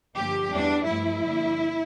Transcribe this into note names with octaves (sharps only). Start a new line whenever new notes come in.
G2 D3 F3 A#3 G4
E2 E3 G3 D4
G2 F3 A3 E4
G2 D3 F3 A#3